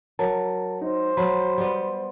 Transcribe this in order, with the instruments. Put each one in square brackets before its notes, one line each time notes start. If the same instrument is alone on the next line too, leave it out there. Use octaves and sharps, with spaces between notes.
[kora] F#3 [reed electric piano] A#4 A5
[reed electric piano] D#4 [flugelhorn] C5
[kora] F#3 [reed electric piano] B5
[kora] G3 B3